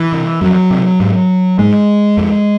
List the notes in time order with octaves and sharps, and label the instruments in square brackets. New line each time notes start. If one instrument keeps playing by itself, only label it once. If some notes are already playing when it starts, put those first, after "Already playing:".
Already playing: [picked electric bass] E3
C3
F2 F#3
C3
G#2
G#2 G#3
F2